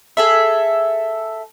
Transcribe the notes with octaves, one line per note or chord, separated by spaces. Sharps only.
G#4 A4 E5